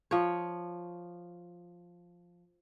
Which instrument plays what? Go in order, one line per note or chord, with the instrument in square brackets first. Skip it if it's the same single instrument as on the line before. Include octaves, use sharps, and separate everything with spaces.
[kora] F3 C#5